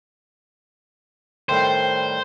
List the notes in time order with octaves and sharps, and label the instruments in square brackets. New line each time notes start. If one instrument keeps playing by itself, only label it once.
[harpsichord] A2 D#3 G3 [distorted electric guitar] C5